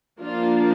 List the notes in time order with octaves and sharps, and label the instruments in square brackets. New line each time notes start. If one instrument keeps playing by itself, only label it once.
[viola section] F3 A#3 D4 F4